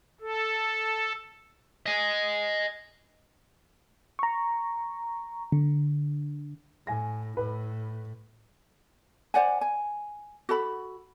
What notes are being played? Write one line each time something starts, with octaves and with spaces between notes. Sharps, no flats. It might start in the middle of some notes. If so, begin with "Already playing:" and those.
A4
D#5 G#5
A#5 C#6
D3
A2 G#5 A#6
A2 B4
C5 D5 F#5 G#5
G#5
F#4 A4 B5